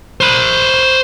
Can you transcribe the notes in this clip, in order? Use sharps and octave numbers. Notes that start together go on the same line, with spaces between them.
C5 B5